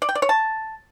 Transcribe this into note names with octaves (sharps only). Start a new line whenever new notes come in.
D5
G5
D5
C#5
A5